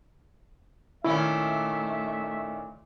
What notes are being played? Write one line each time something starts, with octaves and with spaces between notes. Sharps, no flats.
A#2 D#3 A3 C#4 E4 E5